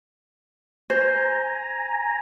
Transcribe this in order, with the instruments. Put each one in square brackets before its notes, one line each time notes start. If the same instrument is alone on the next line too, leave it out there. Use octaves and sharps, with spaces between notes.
[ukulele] C5 [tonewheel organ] G#5 A#5